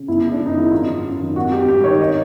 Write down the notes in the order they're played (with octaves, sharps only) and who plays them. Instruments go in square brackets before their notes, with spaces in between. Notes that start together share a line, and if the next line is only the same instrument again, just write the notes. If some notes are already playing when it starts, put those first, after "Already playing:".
Already playing: [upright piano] C#3
G1 E4
G#3
D4
F#2
D#4
D#3 E4
G#1 F4
F#3
F#2
D#3
G#1 F#4
G#1 G4
G2 G4
D#3 C#5
D#5